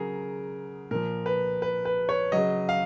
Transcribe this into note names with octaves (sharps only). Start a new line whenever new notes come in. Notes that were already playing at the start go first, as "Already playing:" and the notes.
Already playing: C#3 F#3 G#4 A#4
A#2 F3 A#4
B4
B4
B4
C#5
C#3 F#3 D#5
F5